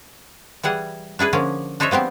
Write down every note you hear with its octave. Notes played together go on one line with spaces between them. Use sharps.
E3 G3 G#4 F#5
D4 E4 G#4 B4
D3 F3 A#3 C#4
D4 D#4 C5 C#5 E5
F3 B3 C4 G4